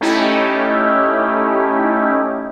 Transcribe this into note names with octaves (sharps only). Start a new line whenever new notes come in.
A3 C#4 D#4 E4 G4